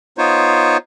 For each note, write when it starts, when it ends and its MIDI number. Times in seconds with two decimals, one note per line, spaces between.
0.18 0.77 59
0.18 0.77 63
0.18 0.77 65
0.18 0.77 72
0.18 0.77 73